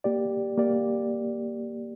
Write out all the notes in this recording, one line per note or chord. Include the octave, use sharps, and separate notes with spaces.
A#3 G4 D5
A#3 G4 D5